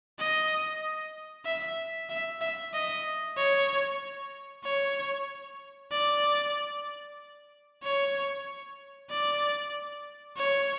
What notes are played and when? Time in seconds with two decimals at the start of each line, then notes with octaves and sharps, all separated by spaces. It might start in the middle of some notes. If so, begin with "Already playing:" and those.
0.19 D#5
1.46 E5
2.09 E5
2.41 E5
2.74 D#5
3.37 C#5
4.64 C#5
5.92 D5
7.83 C#5
9.10 D5
10.37 C#5